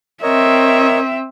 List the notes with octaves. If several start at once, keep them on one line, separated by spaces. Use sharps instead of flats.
C4 A#4 C#5 D#5 E5